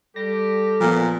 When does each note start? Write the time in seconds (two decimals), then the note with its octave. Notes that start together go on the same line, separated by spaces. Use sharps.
0.16 G3 G4 A4 A#6
0.80 A#2 F3 B3